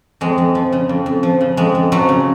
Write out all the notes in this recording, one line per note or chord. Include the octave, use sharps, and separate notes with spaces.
F2 G#3
F2
F3
C#3
F2
F2
F3
C#3
F2 G#3
F2
F3 F#3
C#3